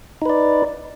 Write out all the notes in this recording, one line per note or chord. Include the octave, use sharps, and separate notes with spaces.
D#4 B4 D5